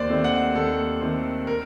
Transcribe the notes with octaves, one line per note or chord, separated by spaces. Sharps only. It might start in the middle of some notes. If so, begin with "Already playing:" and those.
Already playing: D#2 C5 D5
D#3 A3 C4
F#5
D#2 A4
D#3 A3 C4
A#4